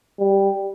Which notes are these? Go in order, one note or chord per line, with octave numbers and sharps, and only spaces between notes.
G3